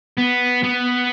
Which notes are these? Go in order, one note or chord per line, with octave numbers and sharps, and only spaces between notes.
B3
B3